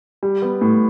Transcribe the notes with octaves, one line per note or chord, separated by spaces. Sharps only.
G3
B3
A2